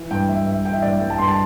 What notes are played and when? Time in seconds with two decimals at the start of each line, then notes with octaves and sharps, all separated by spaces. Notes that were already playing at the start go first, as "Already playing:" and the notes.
Already playing: E3
0.11 G2 G5
0.29 G3 E5
0.47 G2 E5
0.65 E3 G5
0.73 E5
0.82 G2 D5
0.92 E5
1.00 G3 G5
1.10 A5
1.18 G2 C6
1.28 A5